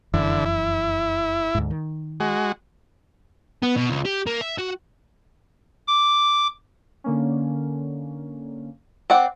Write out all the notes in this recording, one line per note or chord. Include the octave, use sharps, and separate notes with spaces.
F1 F#2 D3 E3 E4
E4
D2 G#2
D#3
G#3 F#4
B3
B2
C#2
G4
A#3
E5
F#4
D6
D3 A#3 C#4
C4 D5 F#5